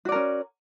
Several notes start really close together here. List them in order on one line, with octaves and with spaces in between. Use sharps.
F#4 D5 A#4 C#4